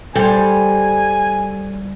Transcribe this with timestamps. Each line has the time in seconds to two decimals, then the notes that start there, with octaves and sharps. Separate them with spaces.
0.16 G3 A4 C5 G#5